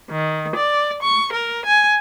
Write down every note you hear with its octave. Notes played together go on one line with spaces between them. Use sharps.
D#3
D5
C#6
A#4
G#5